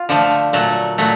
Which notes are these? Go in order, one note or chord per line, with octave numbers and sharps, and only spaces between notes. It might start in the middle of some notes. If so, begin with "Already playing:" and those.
Already playing: F4
D3 F3 A3
A#2 F#3 A3
A#2 F#3 A3